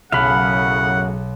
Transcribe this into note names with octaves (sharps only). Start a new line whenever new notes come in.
B1 F#2 A2 C#3 F5 F#5 B5